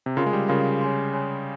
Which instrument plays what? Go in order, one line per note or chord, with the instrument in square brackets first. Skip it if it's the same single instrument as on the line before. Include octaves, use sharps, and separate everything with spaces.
[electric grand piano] C3
[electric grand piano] C#3 [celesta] F4 A#4 F5 C6
[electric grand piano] G#3
G3
[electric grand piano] C#3 [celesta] F4 A#4 F5 C6
[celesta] C#5 G#5 C6
C#5 G#5 C6